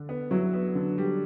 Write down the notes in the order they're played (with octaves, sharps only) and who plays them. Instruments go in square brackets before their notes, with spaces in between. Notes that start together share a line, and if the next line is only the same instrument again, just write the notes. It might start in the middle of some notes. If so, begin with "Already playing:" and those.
Already playing: [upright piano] D3
[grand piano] B3
[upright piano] F#3 [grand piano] E4
[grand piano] B3
D3
G3